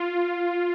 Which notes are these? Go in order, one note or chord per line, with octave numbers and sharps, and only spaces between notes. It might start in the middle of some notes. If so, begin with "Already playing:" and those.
Already playing: F4